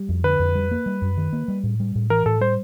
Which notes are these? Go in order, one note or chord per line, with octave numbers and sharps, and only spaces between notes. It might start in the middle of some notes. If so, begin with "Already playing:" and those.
Already playing: G3
F2
D3 B4
F2
G3
A#3
G3
F#2
D#3
A#3
G3
A2
G3
A2
E3 A#4
A2 A4
G3 C5